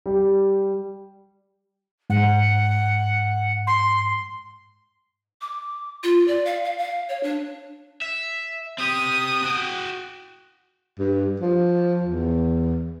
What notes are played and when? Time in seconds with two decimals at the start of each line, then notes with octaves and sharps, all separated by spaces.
0.06 G3
2.10 G#2 F#5
3.67 C6
5.41 D6
6.04 F4
6.28 D5
6.46 F5
6.65 F5
6.78 F5
7.09 C#5
7.23 D4
8.02 E5
8.78 C4 G4 D#6
9.43 F#4 G5
10.99 G2
11.40 F3
12.03 E2